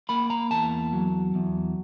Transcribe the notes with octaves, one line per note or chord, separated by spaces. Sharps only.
A#3 B5
A#5
E2 A5
F#3
E2